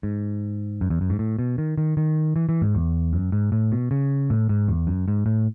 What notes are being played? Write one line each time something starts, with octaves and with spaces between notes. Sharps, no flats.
G#2
F#2
E2
F#2
G#2
A2
B2
D#3
D#3
D#3
E3
E3
G#2
E2
F#2
G#2
A2
B2
C#3
A2
G#2
E2
F#2
G#2
A2